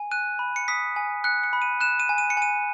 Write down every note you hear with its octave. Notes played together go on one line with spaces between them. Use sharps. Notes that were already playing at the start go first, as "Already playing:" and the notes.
Already playing: G#5
F#6 D#7
B5
C#7
D#6 B6
G#5
F#6 C#7
C#7
B5
D#7
F#6 E7
D#7
G#5
D#7
C#7
G#5 D#7